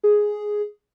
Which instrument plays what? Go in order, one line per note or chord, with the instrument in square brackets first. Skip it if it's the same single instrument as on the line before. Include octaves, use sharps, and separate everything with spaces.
[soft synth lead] G#4